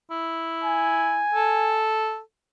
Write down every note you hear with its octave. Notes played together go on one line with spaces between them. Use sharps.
E4
G#5
A4